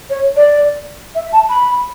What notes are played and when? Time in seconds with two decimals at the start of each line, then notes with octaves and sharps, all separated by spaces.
0.10 C#5
0.36 D5
1.15 E5
1.33 A5
1.49 B5